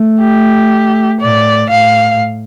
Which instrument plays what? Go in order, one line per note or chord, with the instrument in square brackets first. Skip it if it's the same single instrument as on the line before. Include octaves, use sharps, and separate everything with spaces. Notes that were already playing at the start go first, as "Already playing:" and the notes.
Already playing: [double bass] A3
[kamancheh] G4
[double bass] A2 [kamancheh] D5
[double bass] A2 [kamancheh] F5